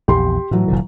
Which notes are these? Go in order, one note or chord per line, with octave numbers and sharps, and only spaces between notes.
A#1 E2 G4 C6
A2 E3 F#3
F1 A#2 D3